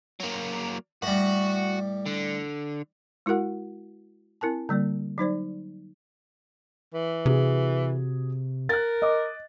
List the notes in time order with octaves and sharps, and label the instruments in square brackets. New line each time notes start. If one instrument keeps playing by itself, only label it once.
[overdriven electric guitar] F#3 A#3
[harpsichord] A2 G3 [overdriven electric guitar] F#4
[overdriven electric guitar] D3
[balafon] G#3 E4 F#4 A#4 F#5
C4 E4 A#4 G#5 A5
D3 G3 A#3 D5
F#3 D#4 C5 D5
[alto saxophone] E3
[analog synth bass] C3 [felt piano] F#4 G#4
[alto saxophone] A#4 [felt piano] F#6 A6
[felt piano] D#5 D6